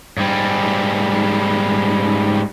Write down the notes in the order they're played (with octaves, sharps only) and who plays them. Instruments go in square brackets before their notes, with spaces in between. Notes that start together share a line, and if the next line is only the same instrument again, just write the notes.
[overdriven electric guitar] G#2 G3